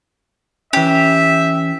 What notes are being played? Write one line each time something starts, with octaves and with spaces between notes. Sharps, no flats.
E3 C#4 G4 E5